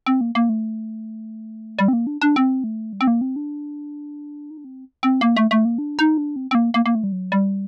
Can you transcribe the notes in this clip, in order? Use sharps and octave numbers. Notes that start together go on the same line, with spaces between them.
C4
A#3
A#3
A3
G3
C4
A#3
D4
D4
C4
A3
G3
C4
A#3
C4
D4
D#4
D4
C4
C4
A#3
A3
A3
A#3
D4
D#4
D4
C4
C4
A#3
A#3
A#3
A3
G3
F#3
G3